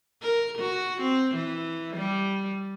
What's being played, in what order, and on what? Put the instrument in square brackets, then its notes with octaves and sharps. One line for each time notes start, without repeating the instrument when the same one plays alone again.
[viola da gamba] A#4
F#4
C4
E3
G3